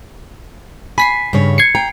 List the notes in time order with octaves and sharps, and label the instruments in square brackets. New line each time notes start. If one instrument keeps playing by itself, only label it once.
[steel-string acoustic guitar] G#5 [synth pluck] B5 B6 C7
[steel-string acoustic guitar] G2 C#3 C#5
[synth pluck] G#6 C7 C#7
[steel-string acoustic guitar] G5 A#5